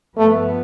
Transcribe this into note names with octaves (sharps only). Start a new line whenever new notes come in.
G2 F3 A3 B3